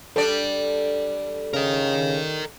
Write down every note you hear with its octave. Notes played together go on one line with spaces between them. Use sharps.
G3 D4 A4 D5
C#3 A#4 D#5